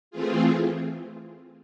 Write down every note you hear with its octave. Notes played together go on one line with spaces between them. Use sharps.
E3 A3 C4 F4 G#4